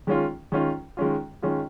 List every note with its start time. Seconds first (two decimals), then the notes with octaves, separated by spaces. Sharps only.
0.07 D#3 G#3 C#4 F4
0.52 D#3 G#3 C#4 F4
0.97 D#3 G#3 C#4 F4
1.42 D#3 G#3 C#4 F4